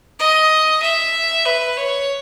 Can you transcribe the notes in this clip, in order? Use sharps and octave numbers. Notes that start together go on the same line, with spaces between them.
D#5
E5
B4
C#5